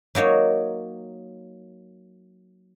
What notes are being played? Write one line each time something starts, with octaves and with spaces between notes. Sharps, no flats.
F#3 A#3 D#4 C#5